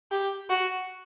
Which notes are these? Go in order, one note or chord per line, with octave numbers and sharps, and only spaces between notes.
G4
F#4